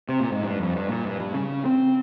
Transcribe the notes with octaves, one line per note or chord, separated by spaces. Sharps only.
C3
A#2
G#2
G2
F2
G2
A#2
G2
G2
C#3
C4